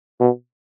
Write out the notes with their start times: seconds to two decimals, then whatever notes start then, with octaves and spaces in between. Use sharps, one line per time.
0.20 B2